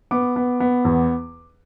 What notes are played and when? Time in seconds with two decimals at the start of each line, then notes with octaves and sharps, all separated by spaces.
0.11 B3 D6
0.36 B3
0.60 B3
0.85 E2